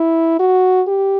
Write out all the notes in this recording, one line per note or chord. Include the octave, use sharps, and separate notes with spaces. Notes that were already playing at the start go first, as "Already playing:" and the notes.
Already playing: E4
F#4
G4